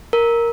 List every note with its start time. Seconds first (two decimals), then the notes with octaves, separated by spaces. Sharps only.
0.13 A#4